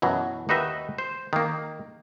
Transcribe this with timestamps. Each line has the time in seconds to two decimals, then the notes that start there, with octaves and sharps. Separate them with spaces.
0.02 F#2 B2 E3 F#3
0.49 D#2 D#4 F#4 B4 D#5 E5
0.98 C5
1.33 D#3 A#3